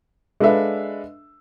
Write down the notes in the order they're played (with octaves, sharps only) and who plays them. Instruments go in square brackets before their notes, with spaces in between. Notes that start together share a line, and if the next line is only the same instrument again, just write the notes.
[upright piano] G#3 D4 A4 B4 E5 F5